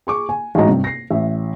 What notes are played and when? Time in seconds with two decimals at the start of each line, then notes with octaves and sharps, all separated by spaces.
0.07 G#4 C#6 D6
0.29 G#5
0.55 A1 G#2 F#4 D#5 A#5
0.68 G2 C3
0.84 A#6 C7
1.10 A1 E5